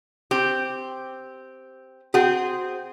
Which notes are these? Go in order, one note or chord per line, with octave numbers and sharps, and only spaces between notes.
C4 G4
C4 F#4 G#4 F#5